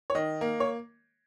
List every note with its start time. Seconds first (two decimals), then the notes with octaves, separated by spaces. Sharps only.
0.10 C#5
0.15 D#3 D#5
0.41 A#3
0.60 C#5